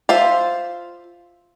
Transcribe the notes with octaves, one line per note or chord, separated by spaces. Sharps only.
F4 C5 E5